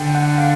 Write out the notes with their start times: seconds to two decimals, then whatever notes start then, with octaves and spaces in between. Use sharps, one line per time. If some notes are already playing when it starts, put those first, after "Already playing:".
Already playing: D3 G5
0.15 F#5
0.38 F5